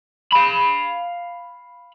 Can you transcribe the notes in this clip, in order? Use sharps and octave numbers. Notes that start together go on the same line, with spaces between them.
F5 B5